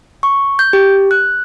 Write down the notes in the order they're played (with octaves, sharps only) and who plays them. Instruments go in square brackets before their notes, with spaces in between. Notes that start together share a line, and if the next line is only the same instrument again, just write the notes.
[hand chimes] C#6
G6
G4
F#6